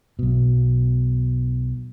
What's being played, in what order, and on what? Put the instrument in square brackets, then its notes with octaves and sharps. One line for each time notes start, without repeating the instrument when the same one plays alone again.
[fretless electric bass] B1 B2